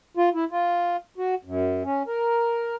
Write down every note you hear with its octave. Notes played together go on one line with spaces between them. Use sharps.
F4
E4
F4
F#4
F#2
C#4
A#4